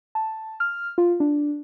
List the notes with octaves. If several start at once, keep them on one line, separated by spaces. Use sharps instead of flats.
A5
F6
F4
D4